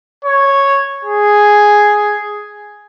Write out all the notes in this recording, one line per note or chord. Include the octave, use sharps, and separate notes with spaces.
C#5
G#4